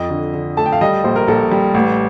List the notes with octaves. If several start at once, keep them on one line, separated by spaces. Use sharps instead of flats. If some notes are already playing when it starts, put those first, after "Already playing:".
Already playing: F2 D#5
D3
D3
A3 A5
G5
F5
G3 D#5
A#1 C5
A#4
A#1 A4
G3
A1